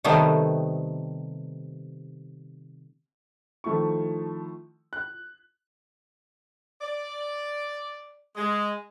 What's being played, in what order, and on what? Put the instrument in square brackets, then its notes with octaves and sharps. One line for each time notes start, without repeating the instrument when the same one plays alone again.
[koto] C3 D#3 G3 A3 B3
[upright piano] D#3 F3 A3 E4 C#6
F#6
[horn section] D5
G#3